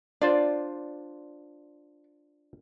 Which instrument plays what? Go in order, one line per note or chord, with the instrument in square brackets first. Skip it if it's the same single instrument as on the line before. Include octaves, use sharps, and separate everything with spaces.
[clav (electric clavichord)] D4 F4 C5 [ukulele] D5